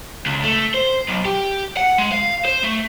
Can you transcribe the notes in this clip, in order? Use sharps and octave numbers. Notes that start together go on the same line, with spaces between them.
C#2
A3
C5
B1
G4
F#5
G#3
F5
C5
A3